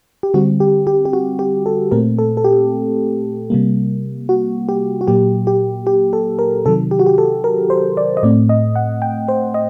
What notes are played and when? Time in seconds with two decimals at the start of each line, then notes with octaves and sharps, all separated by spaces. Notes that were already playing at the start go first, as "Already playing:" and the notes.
0.23 G4
0.34 D3 G3 C4 F#4
0.60 G4
0.87 G4
1.05 G4
1.13 F#4
1.39 G4
1.66 A4
1.91 A#2 A3 C4 A#4
2.19 A4
2.37 A4
2.44 G4
3.50 C3 G3 A#3
4.29 F#4
4.69 G4
5.01 F#4
5.07 A#2 F#3 A#3 G4
5.47 G4
5.87 G4
6.13 A4
6.39 A#4
6.65 C3 D#3 F#3 A4
6.91 G4
6.99 F#4
7.07 G4
7.18 A4
7.44 A#4
7.70 C5
7.97 D5
8.17 D#5
8.23 A2 A3 C4 D5
8.49 D#5
8.76 F#5
9.02 G5
9.28 C5
9.54 D#5